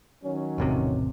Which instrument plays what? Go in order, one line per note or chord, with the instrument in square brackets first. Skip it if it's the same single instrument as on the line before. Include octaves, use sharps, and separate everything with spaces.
[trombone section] D#3 F#3 C#4
[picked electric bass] E1 A1 C3